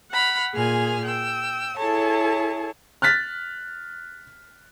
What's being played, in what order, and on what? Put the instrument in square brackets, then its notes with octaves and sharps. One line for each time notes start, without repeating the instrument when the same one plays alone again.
[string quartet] F#5 B5 F6
A#2 G#4 G#5 F6
G5 E6
E4 G#4 A4 C#5 A5
[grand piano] F6 F#6 A6 B6